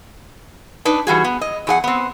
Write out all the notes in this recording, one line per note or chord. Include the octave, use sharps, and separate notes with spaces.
D4 D#4 B4
E3 G3 F#4 G#4
B3
D#5
E2 G#4 F#5
B3 C4